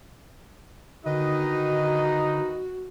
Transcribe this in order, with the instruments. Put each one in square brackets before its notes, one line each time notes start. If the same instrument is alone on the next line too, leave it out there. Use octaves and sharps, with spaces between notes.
[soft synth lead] D3 [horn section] D#3 B4 D#5 [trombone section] D#4 [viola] F#4